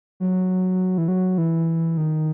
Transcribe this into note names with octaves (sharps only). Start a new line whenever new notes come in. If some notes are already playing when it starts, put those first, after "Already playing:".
F#3
E3
F#3
E3
D#3